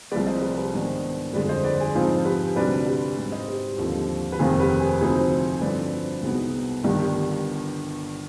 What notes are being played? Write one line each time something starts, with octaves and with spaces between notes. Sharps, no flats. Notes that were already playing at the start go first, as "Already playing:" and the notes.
C2 C3 F3 G#3 B4 D5
C5 D#5
B4 D5
G4 B4
G#2 D#3 B3 D4 G#4 C5
G1 F2 D3 G#3 B4 D5
C5 D#5
B4 D5
G#4 C5
G#2 F3 C4 D#4 F4 G#4
G4 B4
D2 C3 G3 D4 B4 D5
G4 B4
G#2 G3 C4
C5 D#5
G4 B4
D#2 D3 F3 C4 G4
B4
F1 F2 C3 D#3 G#3 F4 G#4
G4 B4
G#4 C5
D2 C3 F3 C4 D#4 G#4 C5
G2 D3 F3 C4 B4 D5
C2 B2 G#3 B3 D#4
G1 G2 D#3 B3 D4 G4
G4